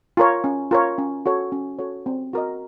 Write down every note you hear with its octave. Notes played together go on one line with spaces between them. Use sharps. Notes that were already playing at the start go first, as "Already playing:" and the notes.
F4 A#4 C#5
C#4
F4 A#4 C#5
C#4
F#4 A4 C#5
C#4
F#4 A4 C#5
C4
F#4 A#4 D#5